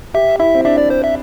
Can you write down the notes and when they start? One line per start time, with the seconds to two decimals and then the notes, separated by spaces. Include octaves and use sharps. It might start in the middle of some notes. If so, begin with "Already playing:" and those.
0.14 G4 E5
0.39 E4 E5
0.55 C4
0.65 D4 E5
0.78 D5
0.90 C5
1.04 E5